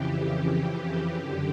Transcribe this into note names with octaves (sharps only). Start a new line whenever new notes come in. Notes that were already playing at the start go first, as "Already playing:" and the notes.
Already playing: F2 C#3 E3 G4
F#2 D3